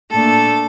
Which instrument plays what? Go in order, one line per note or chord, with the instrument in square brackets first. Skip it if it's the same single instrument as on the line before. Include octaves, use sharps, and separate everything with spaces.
[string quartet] A#2 A3 D4 A4